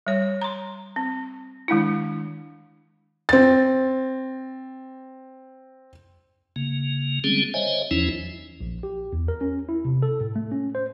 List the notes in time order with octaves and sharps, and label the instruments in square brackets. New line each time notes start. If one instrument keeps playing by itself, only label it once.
[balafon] G3 C#5
A#5 C6
C4
D#3 G#3 D4 E4
[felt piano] C4 A6
[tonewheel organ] C#3 A#3
D3 G3 G#3 C4 C#4 G#4
C5 C#5 D#5 E5 G#5
E2 E3 F3 C#4 D#4 E4
[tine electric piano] A#1
G4
E2
A#4
C#4
E4
C3
A4
A2
A3
C#4
C5